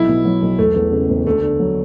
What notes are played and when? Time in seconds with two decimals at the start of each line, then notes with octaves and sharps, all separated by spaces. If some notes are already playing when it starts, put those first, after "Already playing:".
Already playing: B1 E4
0.08 B2
0.25 F#3
0.42 B1
0.58 E1 A3
0.76 E2
0.92 C#3
1.09 E1
1.26 D2 A3
1.43 D3
1.60 F#3